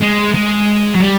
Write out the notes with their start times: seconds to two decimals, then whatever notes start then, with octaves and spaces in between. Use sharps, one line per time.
0.02 G#3
0.35 G#3
0.95 F#3
1.00 G3